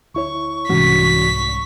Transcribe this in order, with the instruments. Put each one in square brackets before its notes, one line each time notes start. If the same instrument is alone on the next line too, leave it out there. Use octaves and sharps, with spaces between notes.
[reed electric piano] D2 E4 C#5 [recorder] C#6
[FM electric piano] C2 G#2 [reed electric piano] E3 C#4 F#4 [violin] B6